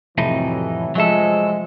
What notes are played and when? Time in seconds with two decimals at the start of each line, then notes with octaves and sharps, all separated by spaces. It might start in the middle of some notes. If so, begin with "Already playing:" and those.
0.18 F2 A2 C3 E3 F#3 A3 D#4
0.95 F3 F#3 G#3 A4 E5